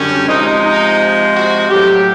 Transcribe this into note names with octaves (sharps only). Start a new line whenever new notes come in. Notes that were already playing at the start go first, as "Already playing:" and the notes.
Already playing: F#2 D3 G3 C#4
C3 F3 G#3 D#4
D#4
F#4
A2 F#3 G4